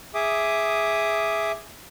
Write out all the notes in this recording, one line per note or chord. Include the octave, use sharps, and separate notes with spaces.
G#4 E5 D6 D#6